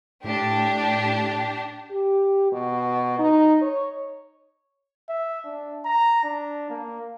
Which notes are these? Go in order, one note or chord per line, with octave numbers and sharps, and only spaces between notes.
A2 D4 G4
G4
B2
D#4
C#5
E5
D4
A#5
D4
A#3